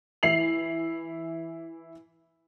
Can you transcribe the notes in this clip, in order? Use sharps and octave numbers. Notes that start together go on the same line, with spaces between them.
E3 E4 C7 F7 F#7